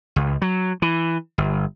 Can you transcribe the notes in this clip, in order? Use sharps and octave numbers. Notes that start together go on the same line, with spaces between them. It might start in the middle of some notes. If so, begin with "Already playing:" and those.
C#2
F#3
E3
G1